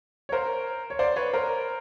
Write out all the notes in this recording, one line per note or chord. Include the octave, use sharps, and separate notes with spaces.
C#5
A#4 C5
C#5
C5 D5
B4 C#5
A#4 C5